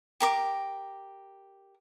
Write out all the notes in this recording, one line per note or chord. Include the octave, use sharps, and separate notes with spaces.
G4 A#4 D6